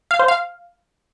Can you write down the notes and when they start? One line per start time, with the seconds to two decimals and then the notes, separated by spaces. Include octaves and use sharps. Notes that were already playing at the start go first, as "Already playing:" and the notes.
0.11 F5
0.20 C5
0.28 F5